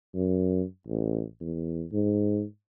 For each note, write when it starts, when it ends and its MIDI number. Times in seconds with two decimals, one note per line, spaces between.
0.14 0.63 42
0.87 1.23 33
1.40 1.85 40
1.92 2.43 44